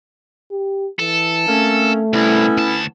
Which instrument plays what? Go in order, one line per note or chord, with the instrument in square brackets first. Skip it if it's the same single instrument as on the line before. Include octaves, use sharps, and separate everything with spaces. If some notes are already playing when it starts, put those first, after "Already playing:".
[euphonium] G4
[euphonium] E3 [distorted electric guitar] A4
[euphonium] A3 [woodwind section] A#3 C4 C#4
[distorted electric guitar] C2 [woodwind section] B3 C#4 E4
[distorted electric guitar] D2 A5